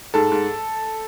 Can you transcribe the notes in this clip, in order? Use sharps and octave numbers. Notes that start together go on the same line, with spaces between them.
G#2 A4
G#2